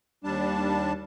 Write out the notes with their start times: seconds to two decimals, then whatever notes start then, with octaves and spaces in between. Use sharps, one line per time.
0.24 D#2 G3 D4 A5